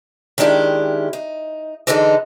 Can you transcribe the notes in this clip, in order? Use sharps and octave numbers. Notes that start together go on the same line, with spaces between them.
D#3 G#3 D4 E4 G4
D#4
D3 E3 G#3 D4 D#4 A4